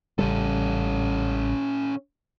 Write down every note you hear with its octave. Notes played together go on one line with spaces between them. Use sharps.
A1 C#3 G3 C#4 A4